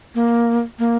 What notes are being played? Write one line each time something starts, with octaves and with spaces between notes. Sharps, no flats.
A#3
A#3